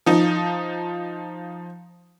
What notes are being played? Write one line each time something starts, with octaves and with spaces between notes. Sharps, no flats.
F3 D#4